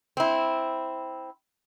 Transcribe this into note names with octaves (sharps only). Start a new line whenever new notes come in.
C4 E4